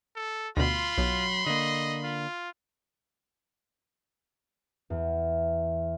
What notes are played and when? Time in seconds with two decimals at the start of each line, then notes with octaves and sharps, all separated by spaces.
0.16 A4
0.57 D2 B2 F4 B5 C6
0.98 B1 F#3
1.46 D3 A#3 D#5
2.04 F4
4.90 E2